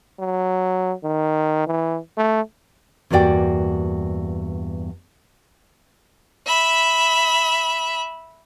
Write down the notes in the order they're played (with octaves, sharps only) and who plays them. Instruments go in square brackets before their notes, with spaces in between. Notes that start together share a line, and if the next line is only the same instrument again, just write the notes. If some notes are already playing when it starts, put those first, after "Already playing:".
[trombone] F#3
D#3
E3
A3
[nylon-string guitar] E2 G2 A#3 F#4 D5 G5
[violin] E5 B5